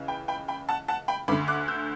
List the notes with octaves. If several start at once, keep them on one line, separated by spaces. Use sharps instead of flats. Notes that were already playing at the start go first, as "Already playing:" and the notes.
Already playing: C#2 C#3 E3
G5 B5
G5 B5
G5 B5
F#5 A5
F#5 A5
G5 B5
D2 D3 B5 D6
D6 F#6
E6 G6